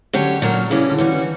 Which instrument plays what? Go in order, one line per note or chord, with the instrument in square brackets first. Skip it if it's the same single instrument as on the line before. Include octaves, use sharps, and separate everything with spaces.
[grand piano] D3 [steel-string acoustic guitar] F#3 C#4 G4 C#5
[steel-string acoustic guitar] A#2 F#3 A#3
[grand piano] C#3 [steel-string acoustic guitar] E3 G3 C#4
[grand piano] D3
[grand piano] E3 [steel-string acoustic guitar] G3 C#4 F#4
[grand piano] E3